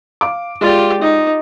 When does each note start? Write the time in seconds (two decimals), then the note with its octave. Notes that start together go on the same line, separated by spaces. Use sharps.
0.21 F5 D6
0.61 G#3 F4 G4 D5 A6
1.02 D#4